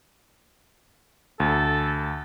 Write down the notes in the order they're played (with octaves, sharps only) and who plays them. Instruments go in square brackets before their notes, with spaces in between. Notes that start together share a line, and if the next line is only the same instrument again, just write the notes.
[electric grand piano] D2 [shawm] A4